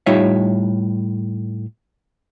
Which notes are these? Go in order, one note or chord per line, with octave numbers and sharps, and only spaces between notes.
A2 G3 D#4 F4 C#5 E5